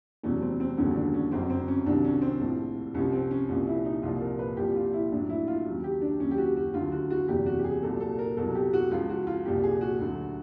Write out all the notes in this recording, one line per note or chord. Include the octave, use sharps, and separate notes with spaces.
F1 E2 B2 F#3 C#4
C4
C4
E1 D#2 D3 F#3 C#4
D4
C#4
G1 F#2 C#3 C4
C4
C#4
C2 C3 D#3 F#3 D4
C#4
C4
A#1 A2 F3
C2 C3 F3 C#4
C4
C#4
C2 A#2 F3 C#4
E4
D#4
C2 A#2 F3 F4
A#4
B4
C2 A#2 F3 G4
F4
E4
A#1 A2 F#3 D4
E4
F4
D#2 C#3 F#3
G4
D4
D#2 C#3 F#3 C#4
G4
F#4
F#4
D2 D3 F#3 F4
F#4
F#4
F#1 E2 C3 G4
F#4
G4
G#4
C2 A#2 F#3 A4
A4
A#4
C2 B2 F#3 A4
G4
F#4
C#2 C#3 F3 F4
F#4
F4
C2 A#2 F3 G4
G#4
F#4
D2 D3 F#3